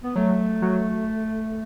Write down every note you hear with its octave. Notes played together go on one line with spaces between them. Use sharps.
B3
F#3 A3
F#3